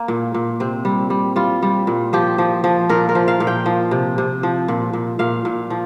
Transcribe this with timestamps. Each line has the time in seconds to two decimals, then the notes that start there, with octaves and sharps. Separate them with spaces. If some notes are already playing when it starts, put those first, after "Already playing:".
Already playing: A#3
0.08 A#2
0.34 A#2
0.60 C3 C4
0.85 G3
1.10 G3
1.36 G3 F4
1.63 G3
1.87 A#2
2.13 F3 G4
2.38 F3
2.64 F3
2.89 A#2 A#4
3.09 A#4
3.15 F3
3.28 F5
3.40 A#2
3.47 G5
3.66 F3
3.91 C3
4.18 C3
4.43 F3
4.68 A#2
4.93 A#2
5.19 A#2 F5
5.45 A#2
5.70 F3